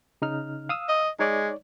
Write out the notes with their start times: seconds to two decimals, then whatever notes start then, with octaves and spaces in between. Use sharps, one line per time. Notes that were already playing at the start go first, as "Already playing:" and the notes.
0.22 C#3 D#4 F6
0.69 F5 D#6 E6
0.89 D#5
1.19 G#3 D#4 C#5 D5